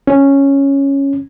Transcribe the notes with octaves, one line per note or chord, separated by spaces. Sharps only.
C#4